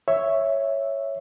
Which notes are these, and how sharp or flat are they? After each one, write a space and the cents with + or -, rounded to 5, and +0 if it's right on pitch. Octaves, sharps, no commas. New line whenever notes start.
C#5 +0 E5 +0